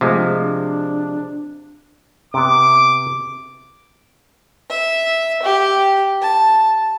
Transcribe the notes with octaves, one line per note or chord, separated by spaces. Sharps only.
C3 F3 G#3 A3
D4
C3 B3 D6
E5
G4
A5